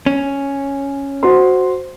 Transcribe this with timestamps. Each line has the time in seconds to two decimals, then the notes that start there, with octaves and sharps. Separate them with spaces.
0.06 C#4
1.23 F#4 C5 C6